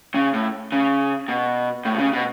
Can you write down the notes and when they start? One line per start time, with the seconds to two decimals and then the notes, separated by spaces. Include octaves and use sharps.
0.15 C#3
0.33 A2
0.72 C#3
1.28 B2
1.85 A2
1.95 B2
1.99 C#3
2.13 B2